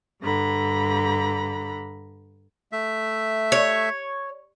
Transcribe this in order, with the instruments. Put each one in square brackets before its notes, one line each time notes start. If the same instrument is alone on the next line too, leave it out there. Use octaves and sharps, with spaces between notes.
[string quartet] G2 D3 A#5 B5
[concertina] A3 E5
[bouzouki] C#5